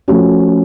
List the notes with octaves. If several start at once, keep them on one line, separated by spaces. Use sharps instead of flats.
F3 A3 C#4 F#4